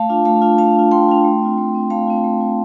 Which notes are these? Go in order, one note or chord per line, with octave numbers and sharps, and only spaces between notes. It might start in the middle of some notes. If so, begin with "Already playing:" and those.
Already playing: A3 F5 A5
D4 F4
A3 F5 A5
D4 F4
A3 F5 A5
D4 F4
A3 G5 C6
D4 F4
A3
C4 F4
A3
C4 F4
A3 F5 A5
C4 F4
A3
C4 F4